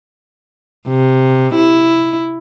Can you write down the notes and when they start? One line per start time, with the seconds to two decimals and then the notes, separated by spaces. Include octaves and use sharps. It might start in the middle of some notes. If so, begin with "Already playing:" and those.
0.87 C3
1.55 E4